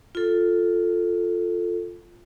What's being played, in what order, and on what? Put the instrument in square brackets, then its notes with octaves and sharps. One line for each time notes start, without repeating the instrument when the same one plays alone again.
[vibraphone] F4 A4